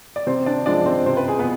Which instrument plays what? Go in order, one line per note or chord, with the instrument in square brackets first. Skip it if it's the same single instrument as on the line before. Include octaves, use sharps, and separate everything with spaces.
[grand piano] D5
C3 C4 C5
D4 D5
F3 G#3 C4 D4 D5
C4 C5
C3 C5
B4
G#4
B3 B4